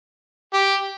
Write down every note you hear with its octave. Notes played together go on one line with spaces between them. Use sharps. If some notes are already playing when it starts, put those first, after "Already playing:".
G4